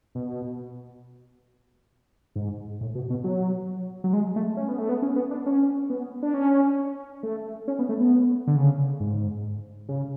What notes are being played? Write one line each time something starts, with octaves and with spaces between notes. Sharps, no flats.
B2
G#2
A2
B2
B2
F#3
F#3
G#3
A3
C#4
B3
A3
B3
C#4
B3
D4
C#4
B3
D4
C#4
A3
C#4
B3
A3
B3
D3
C#3
G#2
C#3